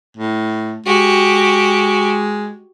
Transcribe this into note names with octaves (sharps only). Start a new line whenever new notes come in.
A2
G#3 F#4 G4